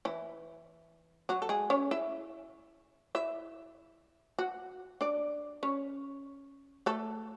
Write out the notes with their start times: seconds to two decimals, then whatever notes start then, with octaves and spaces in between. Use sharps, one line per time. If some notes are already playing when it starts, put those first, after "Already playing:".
0.05 E3 E4
1.29 F#3 F#4
1.42 A4
1.49 G#3 G#4
1.70 C#4 C#5
1.91 E4 E5
3.15 E4 E5
4.39 F#4 F#5
5.01 D4 D5
5.63 C#4 C#5
6.86 A3 A4